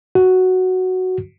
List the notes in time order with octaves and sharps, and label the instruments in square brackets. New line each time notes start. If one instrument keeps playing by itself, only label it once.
[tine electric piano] F#4